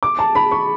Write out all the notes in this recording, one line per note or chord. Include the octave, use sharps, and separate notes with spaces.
D6
A5
B5
C#6